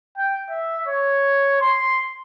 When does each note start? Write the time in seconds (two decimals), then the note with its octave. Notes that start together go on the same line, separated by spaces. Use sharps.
0.17 G5
0.49 E5
0.88 C#5
1.61 C6